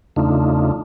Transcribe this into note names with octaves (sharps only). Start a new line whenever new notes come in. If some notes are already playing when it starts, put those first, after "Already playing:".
E2 C#3 A3 D4 D#4 F4